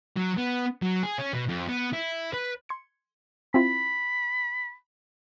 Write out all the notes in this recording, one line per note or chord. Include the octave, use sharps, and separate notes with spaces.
F#3
B3
F#3
G#4
C#4
B2
F2
B3
E4
B4
C6 G#6 C#7
C4 E4 F4 B5